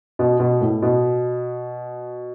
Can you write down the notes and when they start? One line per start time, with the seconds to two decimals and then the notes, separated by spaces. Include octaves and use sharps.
0.19 B2
0.40 B2
0.61 A2
0.82 B2